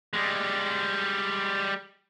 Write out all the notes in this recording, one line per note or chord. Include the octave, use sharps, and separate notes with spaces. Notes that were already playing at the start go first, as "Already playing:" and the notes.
G3 G#3